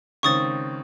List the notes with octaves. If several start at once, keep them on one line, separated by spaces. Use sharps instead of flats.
C#2 D#3 C4 C#6 D#6 A6